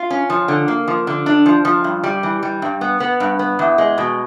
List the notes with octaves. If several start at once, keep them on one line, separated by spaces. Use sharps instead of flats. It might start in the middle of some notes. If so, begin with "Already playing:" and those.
Already playing: F4
C#4
F3
D3
A#3
F3
D3
D4
F3
F3
G2
G3
E3
G3
G2
B3
B3
G2
B3
E2
G#3
B2